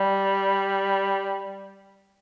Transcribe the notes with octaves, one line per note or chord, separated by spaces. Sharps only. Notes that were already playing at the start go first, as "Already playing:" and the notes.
Already playing: G3